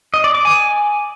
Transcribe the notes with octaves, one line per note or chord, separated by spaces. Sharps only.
D#5
D5
D6
G#5